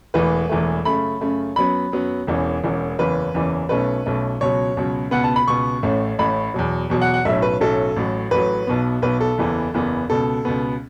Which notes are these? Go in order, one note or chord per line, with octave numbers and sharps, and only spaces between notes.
E1 E2 E3 A3 B4
E1 E2 E3 A3
F#2 C#3 A3 B5
F#2 C#3 A3
F#2 F#3 B3 B5
F#2 F#3 B3
E1 E2 E3 C#4
E1 E2 E3 C#4
F#1 E2 E3 C#4 B4
F#1 E2 E3 C#4
B1 B2 A3 C#4 B4
B1 B2 A3 C#4
C#2 B2 F#3 C#5
C#2 B2 F#3
C#2 B2 B3 F#5
A5
B5
C#2 B2 B3 C#6
A1 A2 A3 C#4
A1 A2 A3 C#4 B5
E2 B2 F#3
E2 B2 F#3
F#5
F#5
B1 A2 F#3 A3 C#4 E5
B4
B1 A2 F#3 A3 C#4 A4
A1 A2 F#3
A1 A2 F#3 B4
B1 B2 B3
B1 B2 B3 B4
A4
F#1 E2 E3 B3
F#1 E2 E3 B3
C#2 B2 B3 A4
C#2 B2 B3